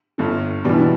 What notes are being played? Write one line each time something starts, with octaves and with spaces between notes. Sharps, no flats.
G1 G2 D3
E2 B2 G3 D4
E4
D4